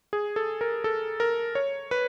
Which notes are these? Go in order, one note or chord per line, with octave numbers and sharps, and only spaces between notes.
G#4
A4
A#4
A4
A#4
C#5
B4